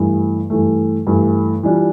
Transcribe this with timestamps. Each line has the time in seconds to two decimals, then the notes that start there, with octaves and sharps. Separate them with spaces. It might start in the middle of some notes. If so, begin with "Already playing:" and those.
Already playing: G2 E3 A3
0.50 G2 E3 A3
1.07 G2 E3 A3
1.63 E3 G3 D4 F4